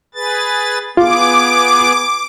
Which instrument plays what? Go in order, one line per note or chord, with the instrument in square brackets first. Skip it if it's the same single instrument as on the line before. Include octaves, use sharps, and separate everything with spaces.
[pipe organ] G#4 B4 A6
[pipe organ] B3 G#4 [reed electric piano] F4 [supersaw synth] D6